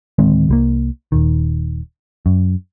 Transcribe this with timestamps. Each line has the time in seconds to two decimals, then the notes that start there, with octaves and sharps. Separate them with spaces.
0.19 D1 D#3 G#3 C4
0.49 C2 G3 A#3
1.12 D#1 D#3
2.26 F#2